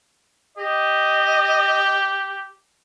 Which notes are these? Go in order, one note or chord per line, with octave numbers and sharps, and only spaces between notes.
G4 D#5